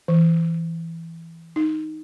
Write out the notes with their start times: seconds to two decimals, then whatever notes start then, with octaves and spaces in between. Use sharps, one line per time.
0.08 E3
1.56 D#4